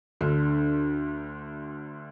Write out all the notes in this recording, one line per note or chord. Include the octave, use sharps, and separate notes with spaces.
D2 D3